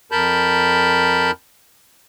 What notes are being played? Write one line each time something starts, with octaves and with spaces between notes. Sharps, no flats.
F2 A#4 A5 B5 G6